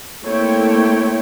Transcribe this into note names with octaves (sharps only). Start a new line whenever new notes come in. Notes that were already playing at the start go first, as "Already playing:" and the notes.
A3 A#3 C4 E4 C#5 G5